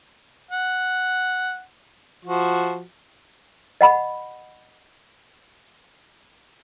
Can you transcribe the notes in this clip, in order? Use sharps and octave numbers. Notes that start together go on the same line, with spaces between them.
F#5
F3 F#4
D#5 F#5 B5